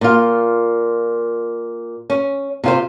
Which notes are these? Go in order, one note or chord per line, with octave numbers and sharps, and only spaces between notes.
A#2 F4
C#4
C3 F4 C5